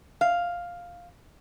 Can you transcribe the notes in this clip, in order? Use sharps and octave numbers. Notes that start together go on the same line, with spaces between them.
F5